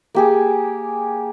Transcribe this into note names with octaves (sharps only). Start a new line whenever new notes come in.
A#3 G4 G#4